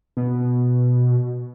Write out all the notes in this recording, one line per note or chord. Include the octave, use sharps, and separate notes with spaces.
B2